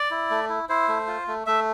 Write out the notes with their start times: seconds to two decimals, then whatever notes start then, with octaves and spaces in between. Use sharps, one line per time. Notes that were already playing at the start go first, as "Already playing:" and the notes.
Already playing: D5
0.11 E4
0.30 A3
0.49 E4
0.69 E4 C5
0.88 A3
1.07 F4
1.27 A3
1.46 A3 E5